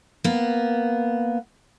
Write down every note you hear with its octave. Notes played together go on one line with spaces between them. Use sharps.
A#3 B3